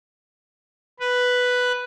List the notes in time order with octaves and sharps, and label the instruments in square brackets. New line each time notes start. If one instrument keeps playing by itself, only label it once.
[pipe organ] B4